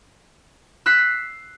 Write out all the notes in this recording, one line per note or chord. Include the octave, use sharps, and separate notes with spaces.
E6 F#6 B6 C7